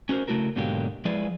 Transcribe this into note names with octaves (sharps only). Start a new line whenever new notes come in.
C#4 F#4 G#4 A#4 C5
C#3 A3 E4 F#4 A#4
G#2 B2 D3 F#3 A#3 G4
F3 G#3 E4 G#4 B4 D5